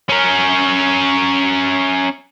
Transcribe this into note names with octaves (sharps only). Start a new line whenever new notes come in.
C#4 A#4